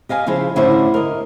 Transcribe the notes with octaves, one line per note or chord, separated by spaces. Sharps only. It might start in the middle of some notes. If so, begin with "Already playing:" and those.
G4 D#5 F5 G#5
C#3 F3 E4 G#4 C5
A2 D3 C#4 E4 G4 C5
A#4 D#5